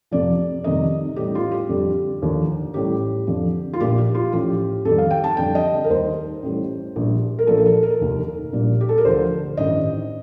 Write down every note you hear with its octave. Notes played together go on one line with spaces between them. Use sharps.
F2 C3 F3 D5
F2 C3 D#3 G3 D#5
A1 A2 G3 G4
F4
G4
F2 D3 G3
D#2 D3 F3
A1 A2 G3 G4
F2 D3 F3
F4
A#1 A#2 F3 G4
G4
F4
A1 A2 F3 G4
F2 D#3 G3 A4
F5
G5
A5
F2 D3 G3 G5
D#5
A#4
D#2 D#3 G3 C5
A1 A2 G3
A#1 A#2 G3
A#4
A#1 A#2 F3 A4
A#4
A4
A#4
F1 D#2 D#3
A#1 A#2 G3
G4
A4
A#4
D2 D3 F3 C5
A1 G2 D#3 G3 D#5